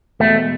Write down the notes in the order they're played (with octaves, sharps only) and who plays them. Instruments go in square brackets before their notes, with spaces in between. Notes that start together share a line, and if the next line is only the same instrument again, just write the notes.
[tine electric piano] E2 B2 G#3 [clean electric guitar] A3